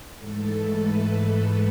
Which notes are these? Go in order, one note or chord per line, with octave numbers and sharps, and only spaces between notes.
G#2 E3 A3 A4
B4